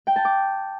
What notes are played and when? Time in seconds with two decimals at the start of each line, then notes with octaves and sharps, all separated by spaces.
0.07 G5
0.16 A5
0.25 D6